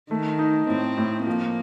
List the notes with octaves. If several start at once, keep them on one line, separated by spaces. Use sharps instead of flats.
D#3 A3
D#4
A2 C4
A2
F3 A#3